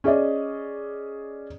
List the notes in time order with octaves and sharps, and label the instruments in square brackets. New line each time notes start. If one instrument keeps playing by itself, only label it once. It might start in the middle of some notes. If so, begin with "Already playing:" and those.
[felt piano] C#4 G#4 D5 D#5